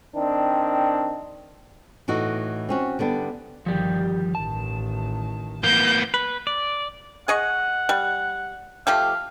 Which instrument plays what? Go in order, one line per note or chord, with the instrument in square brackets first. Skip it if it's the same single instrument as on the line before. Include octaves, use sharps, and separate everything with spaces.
[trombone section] D#3 C4 D4
[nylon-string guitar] A2 E3 D#4 F#4
C4 C#4 F#4
D3 G3 B3 D4
[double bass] G1 D#3 [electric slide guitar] F3 G3 G4
[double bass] A1 D#3 [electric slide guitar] A5
[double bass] E3 [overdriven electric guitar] A#3 B3 [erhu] G6
[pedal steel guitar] B4
D5
[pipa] G#4 D#5 C#6 [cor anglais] F#5
[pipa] G3
[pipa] F3 A3 G4 [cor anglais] F5